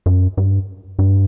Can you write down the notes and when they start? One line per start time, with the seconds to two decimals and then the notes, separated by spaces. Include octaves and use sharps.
0.06 F#2
0.37 G2
0.99 G2